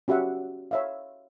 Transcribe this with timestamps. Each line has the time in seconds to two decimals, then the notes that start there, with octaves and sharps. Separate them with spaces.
0.08 C#4 F#4 G4 E5 F#5
0.71 C#5 E5 F5